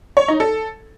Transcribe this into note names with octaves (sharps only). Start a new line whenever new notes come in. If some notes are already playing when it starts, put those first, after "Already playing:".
C#5
D#4
A4